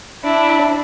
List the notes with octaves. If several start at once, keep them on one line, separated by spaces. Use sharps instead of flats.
D4 E4